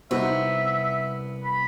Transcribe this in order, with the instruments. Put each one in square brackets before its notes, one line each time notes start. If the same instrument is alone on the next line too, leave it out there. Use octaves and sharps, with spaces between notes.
[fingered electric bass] C3 G3 [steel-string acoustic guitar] B3 [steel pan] D#4 F#4 C5 [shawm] E5
[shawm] B5